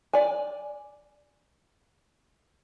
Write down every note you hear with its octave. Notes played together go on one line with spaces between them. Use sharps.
D5 G#5